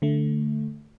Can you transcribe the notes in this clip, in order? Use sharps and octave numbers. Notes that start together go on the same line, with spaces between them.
D3 A3